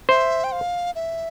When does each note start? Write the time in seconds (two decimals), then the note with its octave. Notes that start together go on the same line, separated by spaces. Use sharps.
0.09 C5 E5
0.44 G5
0.52 F5
0.95 E5